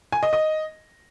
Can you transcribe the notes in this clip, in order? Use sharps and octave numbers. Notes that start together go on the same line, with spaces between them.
G#5
D#5
D#5